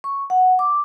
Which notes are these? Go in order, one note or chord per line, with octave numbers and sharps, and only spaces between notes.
C#6
F#5
D6